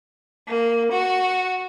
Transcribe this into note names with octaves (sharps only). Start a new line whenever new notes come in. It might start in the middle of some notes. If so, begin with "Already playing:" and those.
A#3
F#4